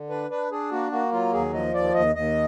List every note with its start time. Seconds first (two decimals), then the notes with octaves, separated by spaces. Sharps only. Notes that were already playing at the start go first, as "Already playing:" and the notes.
Already playing: D3
0.10 D4 B4
0.30 D4 B4
0.51 D4 G#4
0.71 A#3 F#4
0.92 A#3 F#4
1.12 F#3 F4
1.33 D#2 G#4
1.54 F3 D#5
1.74 D#2 D5
1.94 D#2 D#5
2.15 D#2 D#5